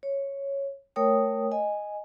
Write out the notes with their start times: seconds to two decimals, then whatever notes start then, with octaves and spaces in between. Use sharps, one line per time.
0.03 C#5
0.96 A3 A#4 C#5 G5 D#6
1.52 D#5 G#5